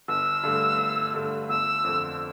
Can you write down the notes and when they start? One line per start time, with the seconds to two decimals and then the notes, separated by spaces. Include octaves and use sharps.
0.08 G1 E6
0.43 G2 D3 A3
0.79 G1
1.13 G2 D3 A3
1.49 G1 E6
1.84 F2 D3